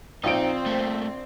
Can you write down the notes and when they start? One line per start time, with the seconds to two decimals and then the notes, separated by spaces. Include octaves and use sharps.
0.24 A#1 C4 D#4 F4 D7
0.66 A3 A#3